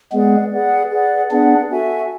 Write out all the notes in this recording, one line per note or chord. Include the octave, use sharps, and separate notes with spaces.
G#3 B3 G#4 B4 D5 F#5
G#4 B4 D5 F#5
G#4 B4 D5 F#5
B3 D4 G#4 B4 D5 F#5
F#4 A4 E5 G#5